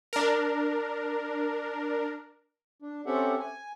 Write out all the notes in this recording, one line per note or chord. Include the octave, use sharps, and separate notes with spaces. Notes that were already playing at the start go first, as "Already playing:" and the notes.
D4 A#4
D4
C4 C#4 G4 A4 E5 F#5
G#5